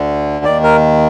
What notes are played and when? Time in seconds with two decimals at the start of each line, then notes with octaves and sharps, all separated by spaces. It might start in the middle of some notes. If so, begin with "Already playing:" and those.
Already playing: D2 D3
0.45 D#2 D#3 D5
0.63 A#4